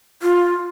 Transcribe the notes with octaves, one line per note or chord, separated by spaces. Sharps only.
F4